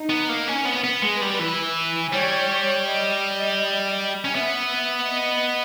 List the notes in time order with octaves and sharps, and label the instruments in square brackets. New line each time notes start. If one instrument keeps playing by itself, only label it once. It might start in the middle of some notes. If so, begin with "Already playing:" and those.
Already playing: [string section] D#4
[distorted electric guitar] B3
A#3
C#4
[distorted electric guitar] B3 [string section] B4
[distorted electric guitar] B3
G#3
G3
E3
[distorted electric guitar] G3 [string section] C#5
[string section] D#5
[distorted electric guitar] C#4
[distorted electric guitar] B3 [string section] E5
[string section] D#5